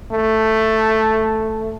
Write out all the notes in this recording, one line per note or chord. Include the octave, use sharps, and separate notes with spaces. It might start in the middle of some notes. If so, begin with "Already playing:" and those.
A3